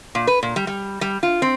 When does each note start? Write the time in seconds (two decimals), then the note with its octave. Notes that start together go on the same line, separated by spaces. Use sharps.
0.15 A#2
0.27 B4
0.43 A#2
0.56 G3
0.67 G3
1.01 G3
1.23 F4
1.42 C4